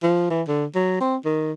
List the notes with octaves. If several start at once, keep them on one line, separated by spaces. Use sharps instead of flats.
F3
E3
D3
F#3
C4
D#3